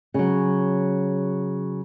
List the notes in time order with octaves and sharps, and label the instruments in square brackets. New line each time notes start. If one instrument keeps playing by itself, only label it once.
[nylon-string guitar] C#3 F#3